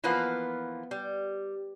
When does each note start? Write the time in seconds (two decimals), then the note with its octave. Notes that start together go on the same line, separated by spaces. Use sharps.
0.04 E3 F3 A#3 B3 F4 B4
0.91 G3